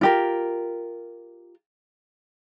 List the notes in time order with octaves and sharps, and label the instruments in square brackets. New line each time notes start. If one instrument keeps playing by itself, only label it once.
[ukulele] F4 G4 A#4